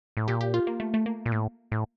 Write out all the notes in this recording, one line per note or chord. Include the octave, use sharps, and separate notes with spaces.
A2
A#2 G4
G4
F4
A#3
A3
A3
A#3
A#2
A2
A2